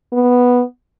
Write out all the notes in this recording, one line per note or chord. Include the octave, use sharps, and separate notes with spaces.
B3